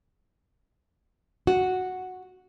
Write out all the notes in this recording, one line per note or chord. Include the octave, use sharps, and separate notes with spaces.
F#4